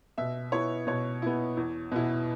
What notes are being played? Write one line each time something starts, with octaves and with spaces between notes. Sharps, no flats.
B2 E5
B3 E4 C#5
B2 C#5
B3 E4
E2
B2 B3 E4